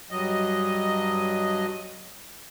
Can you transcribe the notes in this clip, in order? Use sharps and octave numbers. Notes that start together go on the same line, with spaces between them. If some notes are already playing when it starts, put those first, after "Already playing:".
G2 F#3 D#5